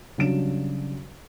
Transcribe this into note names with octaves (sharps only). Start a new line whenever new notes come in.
C#3 F#3 G3 D4 D7 E7